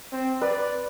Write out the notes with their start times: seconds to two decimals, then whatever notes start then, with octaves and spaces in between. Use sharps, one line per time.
0.12 C4
0.42 B4 D5